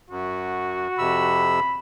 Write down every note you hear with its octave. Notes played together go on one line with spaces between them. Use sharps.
F#2 F#4
F2 C3 B5 E6